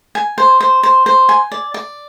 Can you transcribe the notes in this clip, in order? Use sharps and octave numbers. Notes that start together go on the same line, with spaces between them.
G#5
C5
C5
C5
C5
G#5
D5
D5